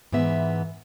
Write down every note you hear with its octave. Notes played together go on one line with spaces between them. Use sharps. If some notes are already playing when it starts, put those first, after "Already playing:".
G#2 E3 B3 E5